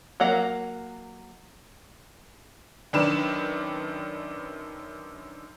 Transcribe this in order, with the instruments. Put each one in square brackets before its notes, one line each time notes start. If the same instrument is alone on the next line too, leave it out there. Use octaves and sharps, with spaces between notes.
[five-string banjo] F#3 A#3 F#5 A#5
[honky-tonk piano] F#2 D#3 D4 B4 E7